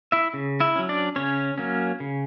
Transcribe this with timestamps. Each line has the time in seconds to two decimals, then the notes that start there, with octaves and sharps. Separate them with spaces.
0.12 E4 E5
0.34 C#3
0.60 E4 E5
0.76 F#3 C#4
0.89 D4 D5
1.16 C#3 C#4 C#5
1.58 F#3 A#3 C#4
2.00 C#3